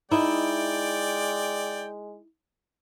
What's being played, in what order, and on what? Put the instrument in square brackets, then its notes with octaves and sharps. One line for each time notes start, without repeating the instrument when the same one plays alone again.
[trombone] G#3 [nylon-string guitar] D#4 E4 [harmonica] D5 G5